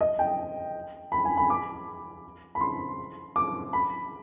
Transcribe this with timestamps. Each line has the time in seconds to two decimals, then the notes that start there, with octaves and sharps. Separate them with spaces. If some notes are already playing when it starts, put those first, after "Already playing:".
0.01 D#5
0.19 G5
1.12 B5
1.25 G#5
1.37 B5
1.50 D6
2.55 B5
2.61 C6
3.36 D6
3.73 B5